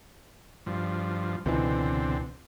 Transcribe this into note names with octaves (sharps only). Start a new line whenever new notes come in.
G2 F3
C#2 B2 D3 E3 C4